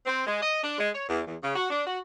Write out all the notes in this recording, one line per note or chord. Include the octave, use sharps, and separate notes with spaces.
C4
G#3
D#5
D4
G#3
C#5
E2
E2
C#3
F#4
D4
F#4